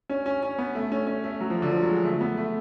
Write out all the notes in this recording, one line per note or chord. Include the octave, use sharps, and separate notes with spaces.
C#4
C#4
C#4
B3
A3
C#4
C#4
A3
F#3
F3
D3
F3
F#3
G#3
A3
B3
A3